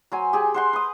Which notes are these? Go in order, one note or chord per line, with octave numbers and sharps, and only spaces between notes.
F#3 C5 G#5
G4 G#4
C5 F#5 C6
B4 D#6